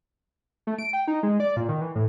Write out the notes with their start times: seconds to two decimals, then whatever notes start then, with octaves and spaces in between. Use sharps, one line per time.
0.67 A3
0.78 D7
0.93 G5
1.08 D#4
1.23 G#3
1.40 D5
1.57 A#2
1.69 D#3
1.81 E3
1.95 A2